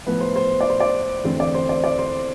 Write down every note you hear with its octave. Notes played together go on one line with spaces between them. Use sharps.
A2 F3 B3 B4
C5
C5
D5
C5
D5
E2 D3 A3 C4 C5
D5
C5
D5
D5
C5